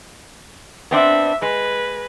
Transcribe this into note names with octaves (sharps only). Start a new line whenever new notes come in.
B3 C4 D4 E5
G#3 B4